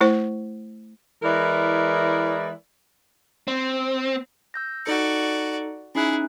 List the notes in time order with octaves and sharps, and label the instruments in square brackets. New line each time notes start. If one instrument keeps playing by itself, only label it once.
[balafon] A3 E4 C5
[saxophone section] E3 G#3 E4 A#4 D5
[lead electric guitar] C4
[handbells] E6 G6 A#6
[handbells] D#4 A4 C#7 [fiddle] F#4 D5
[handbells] C#4 D#4 F#6 [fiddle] E4 G#4